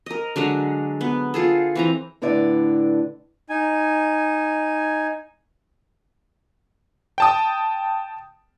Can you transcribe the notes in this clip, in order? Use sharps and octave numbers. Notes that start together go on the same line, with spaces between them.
A#4 D#5
D3 F#3 G#3 D#5
B3
F4 G#4 A4
E3 C4 A#5
A2 D3 E4 B4 D5
D#4 G#5
G5 A5 D#6